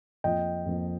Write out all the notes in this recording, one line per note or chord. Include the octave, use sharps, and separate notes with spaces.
F2 F3 A#3 D#5 G5
F2 F3 A#3